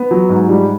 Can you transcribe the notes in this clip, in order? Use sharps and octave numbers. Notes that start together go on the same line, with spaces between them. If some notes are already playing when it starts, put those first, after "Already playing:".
Already playing: B3
F#3
G#2
G3